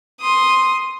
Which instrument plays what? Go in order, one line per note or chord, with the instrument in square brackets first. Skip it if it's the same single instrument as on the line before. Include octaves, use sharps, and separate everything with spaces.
[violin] C6 D#6